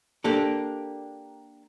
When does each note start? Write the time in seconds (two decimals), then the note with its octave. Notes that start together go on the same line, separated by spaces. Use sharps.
0.24 A#3 D4 G4 A4